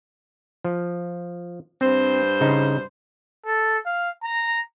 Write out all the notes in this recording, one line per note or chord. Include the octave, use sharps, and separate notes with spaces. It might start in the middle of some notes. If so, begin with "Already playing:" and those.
F3
G2 C4 C5
C#3 D#4
A4
F5
A#5